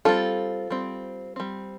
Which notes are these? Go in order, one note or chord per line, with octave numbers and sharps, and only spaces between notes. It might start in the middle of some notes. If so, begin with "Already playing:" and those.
G3 C4 F4 A4
G3 C4
G3 C4